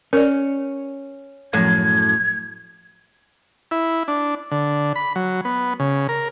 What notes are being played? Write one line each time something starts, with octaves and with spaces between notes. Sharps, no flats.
C#4 A#4 D5
F#2 A2 F3 G#6
E4
D4
D3
B5
F#3
B3
C#3
A#4